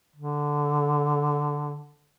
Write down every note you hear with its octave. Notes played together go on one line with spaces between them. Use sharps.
D3